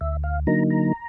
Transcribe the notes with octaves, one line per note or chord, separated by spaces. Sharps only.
D2 E5
F5
D3 F#3 A#3 D#4 A#5
A#5